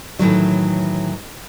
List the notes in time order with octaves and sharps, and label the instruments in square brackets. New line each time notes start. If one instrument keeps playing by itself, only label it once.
[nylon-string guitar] A2 D#3 E3 F#3